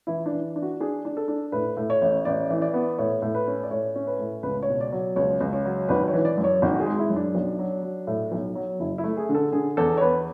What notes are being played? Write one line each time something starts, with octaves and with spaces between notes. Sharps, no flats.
E3 E4
D4
E3
D4
F#4
D4 G#4
D4
A4
D4
A2 B4
A2
C#5
A1
A1 D5
E3
D5
B3
A2 C#5
A2
B4
C#4
D5
A2 C#5
C#4
B4
A2
C#2 B4
C#5
B2
D5
F#3
C#2 C#5
C#2
C#5
F#3
G#1 B4
C#5
E3
D5
F#2
C#5
G#1
F#4
G#4
G#3
E4
F#2
D4
B1
F#3
F#3
A2
B1
F#3
F#1 E4
E4
A3
G#4
D3
A4
D3 G#4
E2 A4
C#5
E2 B4